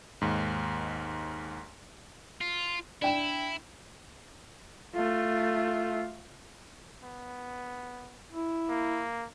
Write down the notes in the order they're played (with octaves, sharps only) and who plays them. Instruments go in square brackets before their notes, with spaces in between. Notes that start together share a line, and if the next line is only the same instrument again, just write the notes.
[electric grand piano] D#2 G#2
[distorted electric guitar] F4
[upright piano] D4 G5 E7 [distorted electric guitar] E4
[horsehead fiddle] A3 F4
[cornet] B3
[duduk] E4
[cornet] A#3